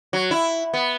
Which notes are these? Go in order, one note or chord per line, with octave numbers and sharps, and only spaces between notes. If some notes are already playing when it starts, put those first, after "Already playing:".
F#3
E4
B3